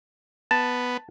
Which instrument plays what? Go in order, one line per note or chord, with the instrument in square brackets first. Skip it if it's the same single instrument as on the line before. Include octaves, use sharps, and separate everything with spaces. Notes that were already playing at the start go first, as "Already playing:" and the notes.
[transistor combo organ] B3 [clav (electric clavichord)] A5